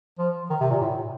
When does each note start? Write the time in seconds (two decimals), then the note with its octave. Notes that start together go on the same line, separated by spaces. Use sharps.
0.19 F3
0.50 D#3
0.61 C3
0.70 A#2
0.81 A2